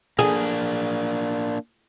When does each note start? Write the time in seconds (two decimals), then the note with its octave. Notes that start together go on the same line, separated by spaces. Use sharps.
0.19 A#3 D4 G#4